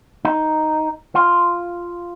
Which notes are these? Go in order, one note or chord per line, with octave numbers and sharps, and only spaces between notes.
D#4
F4